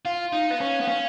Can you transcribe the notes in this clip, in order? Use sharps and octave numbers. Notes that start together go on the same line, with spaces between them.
F4 F5
D#4
B3
C#4
B3
C#4